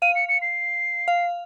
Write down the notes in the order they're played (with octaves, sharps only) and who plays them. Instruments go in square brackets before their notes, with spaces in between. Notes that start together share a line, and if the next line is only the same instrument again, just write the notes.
[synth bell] F5 [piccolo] D#7
[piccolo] C#7
C#7
C7
[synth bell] F5